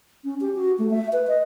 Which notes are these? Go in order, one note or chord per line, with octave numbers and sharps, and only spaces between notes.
C#4
G4
F#4
A3
E5
B4
D#5